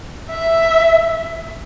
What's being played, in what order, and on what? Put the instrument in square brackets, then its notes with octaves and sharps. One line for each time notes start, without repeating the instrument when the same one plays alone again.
[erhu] E5